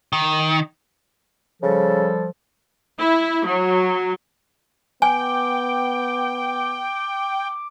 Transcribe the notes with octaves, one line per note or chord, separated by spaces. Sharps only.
D#3
C#3 F3 G3 A4
E4
F#3
B3 G5 G#5 D6